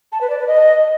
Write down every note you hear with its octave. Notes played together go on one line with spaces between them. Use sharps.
A5
B4
D5
B4
D#5